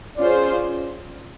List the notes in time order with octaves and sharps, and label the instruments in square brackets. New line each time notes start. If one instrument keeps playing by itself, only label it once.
[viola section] C#4 F4 G#4 C5 [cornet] D5